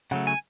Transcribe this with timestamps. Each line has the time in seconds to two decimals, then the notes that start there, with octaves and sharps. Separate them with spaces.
0.11 C#3 F#3 A3 F#5
0.27 G#5